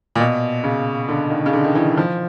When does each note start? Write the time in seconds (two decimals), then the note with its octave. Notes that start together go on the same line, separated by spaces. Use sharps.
0.15 A#2
0.20 B2
0.64 C#3
1.08 D3
1.30 D#3
1.46 C#3
1.53 D3
1.64 D#3
1.75 E3
1.98 F3